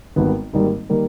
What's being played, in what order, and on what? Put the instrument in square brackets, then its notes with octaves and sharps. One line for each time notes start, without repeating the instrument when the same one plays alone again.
[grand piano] G#1 G#2 D#3 G3 B3
G#1 G#2 D#3 G3 A#3
D#3 G3 A#3